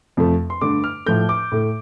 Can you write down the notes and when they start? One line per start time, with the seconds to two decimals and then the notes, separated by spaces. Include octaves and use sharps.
0.17 F2 C3 F3 A3
0.50 C6
0.61 G2 D3 A3 D6
0.84 F6
1.06 A2 F3 A3 G6
1.29 D6
1.52 A2 A3